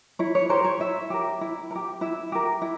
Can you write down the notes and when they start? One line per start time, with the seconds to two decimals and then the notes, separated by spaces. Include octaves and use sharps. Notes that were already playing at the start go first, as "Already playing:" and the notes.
0.19 E4 C#5
0.35 C#5
0.49 G4 A#4 C5
0.64 C#5
0.80 E4 E5
1.10 G4 A#4
1.41 E4
1.71 A#4
1.76 G4
2.01 E4 E5
2.32 G4 A#4
2.62 E4